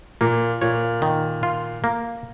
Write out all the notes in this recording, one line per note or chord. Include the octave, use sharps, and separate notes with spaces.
A#2 A#3
A#2 C#5
D#3
F4
A#3